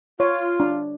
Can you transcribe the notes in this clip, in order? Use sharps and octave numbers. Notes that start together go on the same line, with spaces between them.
F4 C#5
D4